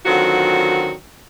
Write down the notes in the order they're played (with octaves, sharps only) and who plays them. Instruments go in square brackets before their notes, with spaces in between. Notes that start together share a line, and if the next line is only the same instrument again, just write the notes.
[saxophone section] D3 D#3 F#3 C4 F4 F#4